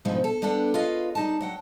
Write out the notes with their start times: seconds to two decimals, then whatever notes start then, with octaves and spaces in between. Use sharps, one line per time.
0.05 G#2 B2 D3 F3 G3 A3
0.24 A4
0.42 G3 B3 D4 A4 F#5
0.74 F4 G#4 B4 C#5 D#5 F5
1.15 G3 D#4 A5
1.41 F#3 F#5 G5